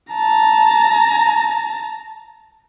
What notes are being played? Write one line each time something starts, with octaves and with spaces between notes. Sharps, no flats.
A5 A#5